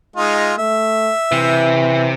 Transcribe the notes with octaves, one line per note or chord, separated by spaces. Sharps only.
G#3 D#4 F4
A3 E5
C3 E3